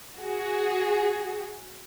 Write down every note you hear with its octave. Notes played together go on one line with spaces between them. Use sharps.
F#4 G#4